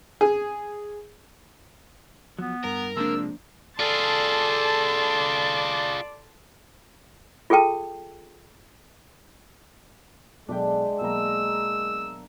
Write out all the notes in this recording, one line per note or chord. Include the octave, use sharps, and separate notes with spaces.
G#4
F3 F#3 B3
G2 A#4
C3 F3 G#3 A#3 D4 E6
F4 G#4 A4 D5 A5 C6
F4 G#4 A4 G5 A5
B1 G#3 D4 G#4 A4 E5 G5
B1 A#3 A#5 E6